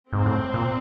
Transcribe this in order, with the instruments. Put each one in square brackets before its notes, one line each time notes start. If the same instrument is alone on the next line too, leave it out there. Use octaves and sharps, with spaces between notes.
[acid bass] G#2 [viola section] C4
[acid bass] A2
A#2